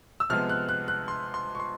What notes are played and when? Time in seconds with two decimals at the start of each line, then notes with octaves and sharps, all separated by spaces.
0.20 E6
0.30 C3 F3 G#3 B3 F6
0.49 F#6
0.69 F#6
0.88 F#6
1.08 C6
1.34 C6
1.55 C#6
1.60 C6